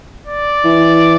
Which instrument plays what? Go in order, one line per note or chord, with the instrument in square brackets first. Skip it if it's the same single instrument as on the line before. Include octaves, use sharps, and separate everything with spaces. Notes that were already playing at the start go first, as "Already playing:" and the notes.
[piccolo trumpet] D5
[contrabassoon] E3